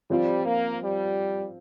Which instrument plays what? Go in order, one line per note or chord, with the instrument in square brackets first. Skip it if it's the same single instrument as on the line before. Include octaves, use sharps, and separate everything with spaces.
[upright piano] F3 C4 F4 C5 [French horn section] G3
[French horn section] A#3
G3